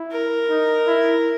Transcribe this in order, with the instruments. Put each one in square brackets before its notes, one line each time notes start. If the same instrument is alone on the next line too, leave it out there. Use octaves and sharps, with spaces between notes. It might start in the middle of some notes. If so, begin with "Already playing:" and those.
Already playing: [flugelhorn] E4
[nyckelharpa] A#4
[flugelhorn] D#4
E4